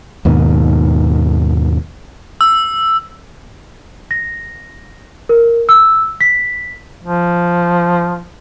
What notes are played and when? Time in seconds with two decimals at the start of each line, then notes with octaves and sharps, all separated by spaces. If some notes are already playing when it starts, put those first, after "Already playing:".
0.25 D#2 G#2 B2 D#3
2.41 E6
4.11 A#6
5.29 A#4
5.69 E6
6.21 B6
7.04 F3